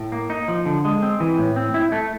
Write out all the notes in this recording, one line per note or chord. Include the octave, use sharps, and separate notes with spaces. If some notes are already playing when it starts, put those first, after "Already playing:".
Already playing: A2
A#3
D#4
F3
D3
G#3
C4
E3
A2
C4
E4
A3